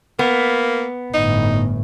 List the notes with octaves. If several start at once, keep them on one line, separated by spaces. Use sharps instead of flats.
A#3 B3
G1 A2 D#4